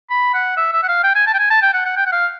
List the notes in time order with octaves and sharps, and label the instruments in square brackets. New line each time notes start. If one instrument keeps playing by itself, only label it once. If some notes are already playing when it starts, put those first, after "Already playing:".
[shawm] B5
F#5
E5
E5
F#5
F5
G5
G#5
A5
G5
G#5
A5
G5
F#5
F#5
G5
F#5
F5